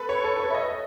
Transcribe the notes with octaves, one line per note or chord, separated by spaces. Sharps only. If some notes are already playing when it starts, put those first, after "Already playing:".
Already playing: A4 B4
C#5
A4
B4
C#5
E5
D#5